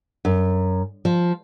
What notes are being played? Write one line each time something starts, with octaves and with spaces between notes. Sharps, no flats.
F#2
F3